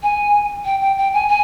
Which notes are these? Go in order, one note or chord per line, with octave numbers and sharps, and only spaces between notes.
G#5
G5
G5
G5
G#5
G#5